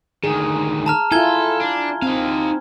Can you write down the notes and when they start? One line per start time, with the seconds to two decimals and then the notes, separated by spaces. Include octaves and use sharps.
0.24 D2 D#3 G#4
0.86 A5 A#5 F6
1.12 E4 F4 A4 G#5 G#6 G7
1.61 D4
2.02 C4 D#4 F5